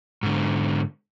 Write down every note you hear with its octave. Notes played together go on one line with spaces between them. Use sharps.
G#2 D3